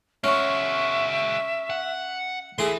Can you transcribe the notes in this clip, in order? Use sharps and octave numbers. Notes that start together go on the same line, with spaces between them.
G#3 C#4 F#4 E5 C#6 F6
F#5
E3 G#4 A4 E5 C6